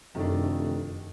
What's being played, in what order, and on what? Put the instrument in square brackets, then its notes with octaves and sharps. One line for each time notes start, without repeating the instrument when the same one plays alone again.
[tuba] F1 [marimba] F#2 [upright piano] D#3 A3 D4